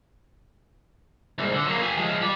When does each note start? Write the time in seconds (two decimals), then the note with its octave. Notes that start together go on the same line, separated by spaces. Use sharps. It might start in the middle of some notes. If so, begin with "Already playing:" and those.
1.38 C2 G#2
1.53 D3
1.67 F#3 A#3
1.83 G4 G#5
1.97 F3 G#3
2.21 G4 D5